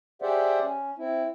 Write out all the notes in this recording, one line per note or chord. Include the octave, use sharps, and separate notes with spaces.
G4 G#4 C5 D5 E5 F#5
C#4
C4 E4